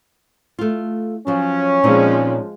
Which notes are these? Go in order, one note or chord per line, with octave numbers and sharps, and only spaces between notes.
A3 F4
F3 F#3 C#4
A#2 F3 G#3 C4 D#4